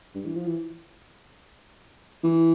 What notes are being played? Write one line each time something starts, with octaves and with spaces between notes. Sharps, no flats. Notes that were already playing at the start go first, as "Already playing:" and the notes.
G2
E3
F3
E3
E3